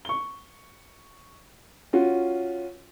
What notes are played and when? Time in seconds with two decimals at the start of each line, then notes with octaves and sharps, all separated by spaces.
0.05 C#6 G7
1.93 C#4 F4 F#4